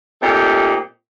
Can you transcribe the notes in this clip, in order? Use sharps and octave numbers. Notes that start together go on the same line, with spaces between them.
A#2 G3 A3 C4 D#4 G4